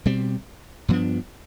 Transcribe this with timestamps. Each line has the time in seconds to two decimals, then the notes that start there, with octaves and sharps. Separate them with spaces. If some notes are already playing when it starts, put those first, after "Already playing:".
0.06 B2 G3 C4
0.88 G2 F3 B3 D4